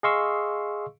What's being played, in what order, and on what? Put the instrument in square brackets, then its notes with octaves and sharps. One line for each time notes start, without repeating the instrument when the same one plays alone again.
[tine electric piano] G#4 D#5 F5 C6 C#6 E6